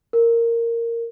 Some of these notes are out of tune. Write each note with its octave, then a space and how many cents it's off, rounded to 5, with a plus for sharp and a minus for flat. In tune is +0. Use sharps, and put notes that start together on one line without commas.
A#4 -10